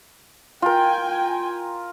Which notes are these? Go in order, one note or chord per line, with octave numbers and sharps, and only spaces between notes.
F4 A#4 G5 G#5